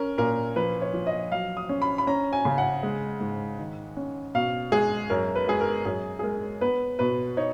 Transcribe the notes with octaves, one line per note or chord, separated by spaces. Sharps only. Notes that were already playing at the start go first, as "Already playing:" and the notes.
Already playing: C#4 A#4
A#2 A#4
F3 B4
C#5
F3
D#5
F#3 F5
D#6
C#4
B5
B5
C#4 A#5
G#5
C#3
F#5
G#3
G#2
D#3
C#4
B2 F5
G#3 G#4
F#2 A#4
B4
G#3 G#4
A#4
F#2 G#4
G#4
G#3 A#4
B3 B4
B2 B4
D#4 C#5